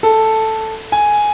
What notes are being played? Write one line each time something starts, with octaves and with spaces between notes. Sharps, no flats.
A4
G#5